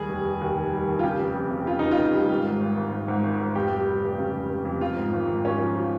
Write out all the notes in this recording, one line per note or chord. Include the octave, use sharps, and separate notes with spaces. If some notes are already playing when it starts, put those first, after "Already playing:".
Already playing: D#2 G3 G#4
F1
F1
D#2
D#3
G3
D#3
F4
C#3 G4
F1
F2
C#3
C#3 F4
F1 D#4
F4
F1
G3
G#1
G#2
G#1
G#1
G#1
G#2
G#1
G#2
F1 G4
G3
G3
F1
C#3
F1
F1
F2
F3 F4
G#2
G#1
G#1
G#1 C#4
F3
F3